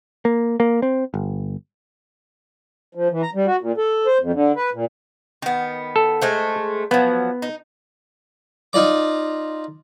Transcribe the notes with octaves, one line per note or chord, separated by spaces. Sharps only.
A#3
A#3
C4
G1
F3
E3
A#5
G3
F#4
A#2
A4
C5
F2
D3
B4
A#2
D#3 B3
A4
G#3 A3 C5
F3 F#3 B3
D#4
D#4 F4 D5 D6